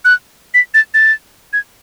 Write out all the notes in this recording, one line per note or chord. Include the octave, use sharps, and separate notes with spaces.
F#6
B6
A6
A6
G#6